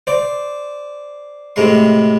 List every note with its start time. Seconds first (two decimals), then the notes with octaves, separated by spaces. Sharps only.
0.07 C5 D5
1.56 A2 C3 G#3 C6